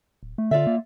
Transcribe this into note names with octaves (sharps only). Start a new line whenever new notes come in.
D1
A3
D3 F4 D5 E5
A#3